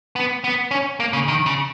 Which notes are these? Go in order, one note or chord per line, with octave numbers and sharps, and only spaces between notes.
B3
B3
C#4
A#3
C#3
D#3
C#3